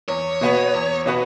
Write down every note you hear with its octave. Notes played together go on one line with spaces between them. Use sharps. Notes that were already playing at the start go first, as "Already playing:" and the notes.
E2 C#5
B2 B3 F#4 B4
E2
B2 B3 F#4 B4